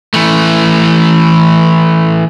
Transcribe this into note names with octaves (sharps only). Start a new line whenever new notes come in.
E3 A3